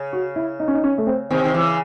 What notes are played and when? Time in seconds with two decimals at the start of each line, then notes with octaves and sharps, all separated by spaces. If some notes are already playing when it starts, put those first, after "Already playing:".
Already playing: C#3
0.13 F#4
0.36 E4
0.60 D#4
0.68 C#4
0.74 D#4
0.84 C#4
0.98 A3
1.07 C4
1.30 C3 D#3 C4
1.44 D#3
1.54 C#3 E3